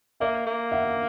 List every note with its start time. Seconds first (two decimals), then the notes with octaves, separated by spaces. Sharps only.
0.20 A#3 D5 E5
0.47 A#3
0.72 E5 F#5